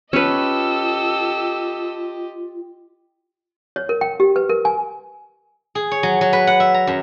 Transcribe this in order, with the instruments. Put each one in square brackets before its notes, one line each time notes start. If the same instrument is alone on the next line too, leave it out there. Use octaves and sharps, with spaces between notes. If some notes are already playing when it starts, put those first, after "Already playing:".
[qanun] C#4 B4 [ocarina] F4 [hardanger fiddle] G4 D#5 [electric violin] A4 E6
[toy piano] C#5
A#4
G5
G4
B4
A#4
G#5
[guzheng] G#4
C#5
F#3
F#3
B4
F#5
E5
A#5
F#2